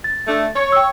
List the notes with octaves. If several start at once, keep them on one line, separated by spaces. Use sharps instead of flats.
A6
A3 D4
C#5
G5 E6